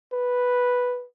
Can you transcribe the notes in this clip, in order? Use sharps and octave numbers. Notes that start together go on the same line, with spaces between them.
B4